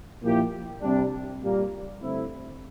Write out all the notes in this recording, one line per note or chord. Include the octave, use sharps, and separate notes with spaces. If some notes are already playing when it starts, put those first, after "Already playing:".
A#2 F3 A#3 E4 G4
C3 G3 D4
A#2 G3 A#3
G2 D3 A3 C4 E4